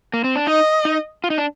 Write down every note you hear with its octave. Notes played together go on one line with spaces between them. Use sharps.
A#3
C4
D4
D#4 D#5
D#4
F4
D#4
D4